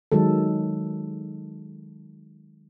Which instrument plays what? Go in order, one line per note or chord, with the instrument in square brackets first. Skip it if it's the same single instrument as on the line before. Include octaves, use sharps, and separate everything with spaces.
[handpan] D#3 F#3 G#3 A4